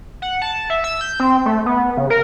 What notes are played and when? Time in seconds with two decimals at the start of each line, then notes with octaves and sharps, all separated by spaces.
0.22 F#5
0.42 A5
0.70 E5
0.84 E6
1.01 G6
1.20 C4
1.46 A3
1.66 B3
1.97 C#3
2.10 A#4